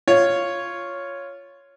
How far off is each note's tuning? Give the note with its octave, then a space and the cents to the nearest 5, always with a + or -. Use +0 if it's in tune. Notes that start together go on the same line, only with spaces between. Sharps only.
F4 -5 C#5 +0